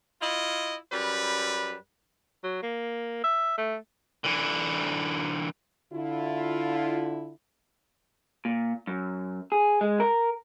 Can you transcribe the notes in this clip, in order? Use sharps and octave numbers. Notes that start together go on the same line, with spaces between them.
E4 F4 D#5
F#2 G3 B4
F#3
A#3
E5
A3
D3 E3
D3 E4 F4
A#2
F#2
G#4
G#3
A#4